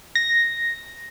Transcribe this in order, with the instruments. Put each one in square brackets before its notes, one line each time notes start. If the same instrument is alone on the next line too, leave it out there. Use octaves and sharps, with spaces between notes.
[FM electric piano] A#6